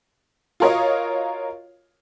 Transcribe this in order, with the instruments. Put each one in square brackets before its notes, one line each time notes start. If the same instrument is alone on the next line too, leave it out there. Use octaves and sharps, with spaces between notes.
[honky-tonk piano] F4 F#4 A#4 C#5 D#5 F5